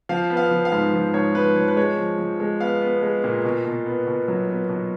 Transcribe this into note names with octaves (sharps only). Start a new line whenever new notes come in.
F3 F5
B3
F5
F3
F5
G#2
F3
G#2 C#5
F3 B4
F3 C#5
B4
G#3 C#5
F3
F3
G#3
B3 F5
B3
G#3
A#2
B2
B2
B3
B2
F#3
B3
B2